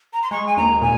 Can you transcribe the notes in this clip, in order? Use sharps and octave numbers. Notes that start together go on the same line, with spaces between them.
A#5
C6
G#3 C#6
G#5
D#2 A#5
A#2 G#5